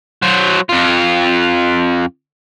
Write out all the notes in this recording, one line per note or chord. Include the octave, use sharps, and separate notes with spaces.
F#3 C5
F2 F4